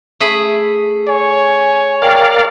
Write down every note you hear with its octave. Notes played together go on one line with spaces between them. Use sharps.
A3 G#4 B5
C#5 G#5
A#4 D5 F5 G5